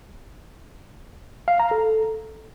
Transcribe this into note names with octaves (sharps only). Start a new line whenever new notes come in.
F5
A#5
A4